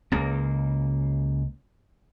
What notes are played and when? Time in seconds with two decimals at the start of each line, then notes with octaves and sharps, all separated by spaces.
0.12 C#2 C#3 A#3